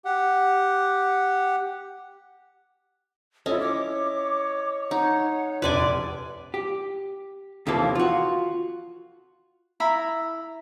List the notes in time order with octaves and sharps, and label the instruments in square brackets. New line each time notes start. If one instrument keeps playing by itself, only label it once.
[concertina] G4 F#5
[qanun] C#4 [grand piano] E4 D#5 [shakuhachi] F4 [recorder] A4
[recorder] C#5 [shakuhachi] D6
[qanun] D#4 [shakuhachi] F#5
[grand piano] F1 A#1 D4 [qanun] B4 D5 G#5 [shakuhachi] C6
[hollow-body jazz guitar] G4
D#2 C3 E3 F3 A#3 A4
F4 F#4
[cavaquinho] E4 A#5 B5